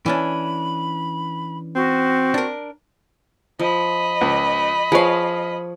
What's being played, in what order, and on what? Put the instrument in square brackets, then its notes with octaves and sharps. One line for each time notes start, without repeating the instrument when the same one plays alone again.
[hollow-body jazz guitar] E3 C#4 D4 [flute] B5
[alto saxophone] C4 [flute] F#4
[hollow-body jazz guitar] D4 A#4
[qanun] F3 [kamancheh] D#5 B5
[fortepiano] C#2
[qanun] F3 F5 [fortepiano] G#4 B4 C#5